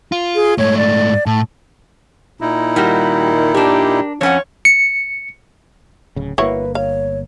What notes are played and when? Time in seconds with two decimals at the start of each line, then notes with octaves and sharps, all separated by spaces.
0.12 F4
0.35 G#4
0.58 G#2 A3 C#5
0.77 D5
1.26 A2 A5
2.41 A#2 D#4 E4
2.76 D#3 G3 F#4 G4
3.54 D4 G4 A#4
4.21 F2 C#4 C#5 F#5
4.65 C#7
6.16 D1 C#3
6.38 G1 A#3 E4 F#4 B4 C#5
6.75 C#5 F5